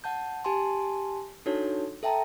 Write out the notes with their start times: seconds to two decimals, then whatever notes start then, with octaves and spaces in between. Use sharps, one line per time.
0.04 F#5 A5 G6
0.45 G4 G#5 A5 C6
1.46 D4 D#4 F#4 A4 C#5
2.03 A4 E5 G5 A5 A#5